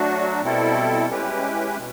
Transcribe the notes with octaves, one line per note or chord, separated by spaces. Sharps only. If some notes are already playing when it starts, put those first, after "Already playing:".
Already playing: F#3 A3 D4 F#4
B2 G3 C4 E4 A4
G#3 C#4 E4 G4 B4
B2